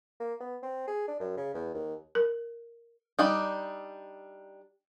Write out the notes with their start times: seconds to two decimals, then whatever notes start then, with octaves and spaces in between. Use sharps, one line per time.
0.20 A#3
0.40 B3
0.63 C4
0.88 G#4
1.08 D4
1.20 F#2
1.37 C#3
1.54 E2
1.74 D#2
2.15 A#4
3.19 G3 D4 D#4